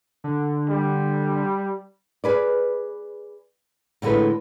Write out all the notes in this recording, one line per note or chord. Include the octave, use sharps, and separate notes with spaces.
D3
G3
G#4 B4 D5
A2 D3 G#3 A4 B4